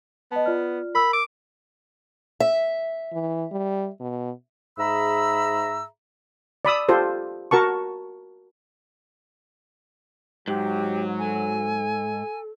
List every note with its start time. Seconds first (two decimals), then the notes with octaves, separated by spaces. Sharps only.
0.32 B3 D#5 A5
0.46 F4 D5 F6
0.95 A#4 B5 E6
1.13 D6
2.40 E5
3.12 E3
3.52 G3
4.00 B2
4.79 G#2 G#4 E5 A#5 B5 E6
6.65 D5 B5 D#6 E6
6.89 F4 G4 A4 C5
7.51 F#4 A#4 A5 C#6
10.48 G#2 F#3 G4
11.19 A4 G#5